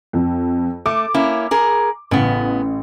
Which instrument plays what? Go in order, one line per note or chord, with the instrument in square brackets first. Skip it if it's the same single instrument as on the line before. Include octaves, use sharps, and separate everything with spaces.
[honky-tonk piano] F2
[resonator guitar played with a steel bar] A3 [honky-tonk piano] D6
[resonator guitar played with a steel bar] A#3 C#4 E4
G#4 A#4
[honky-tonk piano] A1 [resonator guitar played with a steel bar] C#3 B3